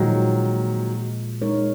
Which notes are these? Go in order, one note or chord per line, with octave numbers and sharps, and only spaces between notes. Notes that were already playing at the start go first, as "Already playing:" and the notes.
Already playing: A#2 D#3 F3 F#3 G#3
G#3 D#4 A#4 C#5